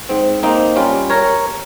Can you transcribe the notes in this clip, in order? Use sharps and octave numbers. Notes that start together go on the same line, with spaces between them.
G#2 C4
A#3 C4 D#4
G3 C#4 F4
A#4 C#5